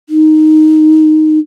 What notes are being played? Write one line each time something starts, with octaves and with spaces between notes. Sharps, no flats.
D#4